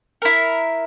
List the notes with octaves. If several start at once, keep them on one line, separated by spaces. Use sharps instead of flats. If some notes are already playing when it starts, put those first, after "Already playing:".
E4 A#4